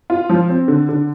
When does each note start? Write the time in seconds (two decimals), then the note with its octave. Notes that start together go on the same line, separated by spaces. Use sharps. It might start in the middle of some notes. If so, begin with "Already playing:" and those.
0.10 F4
0.29 F3
0.49 C4
0.68 D3
0.89 D3